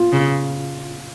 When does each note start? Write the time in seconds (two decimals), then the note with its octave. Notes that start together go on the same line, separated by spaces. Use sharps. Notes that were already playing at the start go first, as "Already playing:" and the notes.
Already playing: F4
0.12 C#3